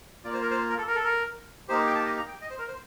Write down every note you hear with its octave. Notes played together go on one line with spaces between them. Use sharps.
A#3 F4 D5
C5
A#4
C5
A#4
A4
A#4
A4
A#4
A#3 D#4 G4 C5
G5
A5
D#5
A#5
G5
D#5
C5
A#4
C5